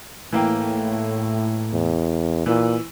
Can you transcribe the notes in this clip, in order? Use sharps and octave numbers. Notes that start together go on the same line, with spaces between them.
A2 E3 A#3 G5
E2
A#2 E3